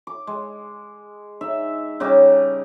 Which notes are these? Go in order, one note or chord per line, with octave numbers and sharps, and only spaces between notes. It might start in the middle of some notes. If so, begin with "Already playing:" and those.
D6
G#3
D#4 E5
C#3 G3 D#4 D6